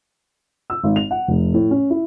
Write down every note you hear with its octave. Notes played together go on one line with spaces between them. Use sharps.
E6
G#1
F7
F#5
F1
A2
C#4
E4